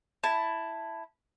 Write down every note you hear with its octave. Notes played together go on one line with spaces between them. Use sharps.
E4 A5